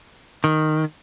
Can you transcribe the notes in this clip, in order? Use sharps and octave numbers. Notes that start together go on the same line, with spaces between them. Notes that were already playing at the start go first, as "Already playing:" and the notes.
D#3